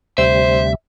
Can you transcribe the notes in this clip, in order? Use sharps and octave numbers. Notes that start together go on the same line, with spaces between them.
D2 C3 G3 C5 E5